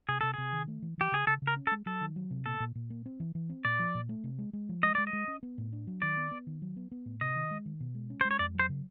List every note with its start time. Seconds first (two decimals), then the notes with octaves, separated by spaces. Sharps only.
0.08 C3 G#4
0.21 C3 A4
0.34 C3 G#4
0.53 D#3
0.68 A3
0.82 E3
0.98 E3 G4
1.12 C#3 G#4
1.27 C#3 A4
1.42 C#3
1.47 A#4
1.56 C#4
1.67 A4
1.71 G#3
1.86 F#3 A4
2.01 D#3
2.16 F#3
2.31 C3
2.46 A#2 A4
2.60 A#2
2.75 A#2
2.90 A#3
3.06 C4
3.20 E3
3.35 E3
3.49 C4
3.65 A#2 D5
3.79 F3
3.95 A#2
4.09 A3
4.24 C3
4.38 G#3
4.53 G#3
4.69 F3
4.83 G#3 D#5
4.95 G#3 D5
5.07 D#5
5.13 G#3
5.28 C#4
5.43 B3
5.58 A2
5.72 D4
5.87 F#3
6.02 D#3 D5
6.17 B3
6.31 B3
6.47 D#3
6.62 F#3
6.76 B3
6.91 B3
7.06 A2
7.21 C3 D#5
7.36 D#3
7.51 G#3
7.66 D#3
7.80 B2
7.95 G#3
8.10 C#4
8.21 G#3 C5
8.31 C#5
8.39 F2 D5
8.55 F#3 C5
8.69 C#3